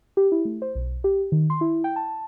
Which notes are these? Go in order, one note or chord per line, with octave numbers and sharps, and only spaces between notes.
G4
E4
A3
C5
B1
G4
D#3
C6
E4
G5
A5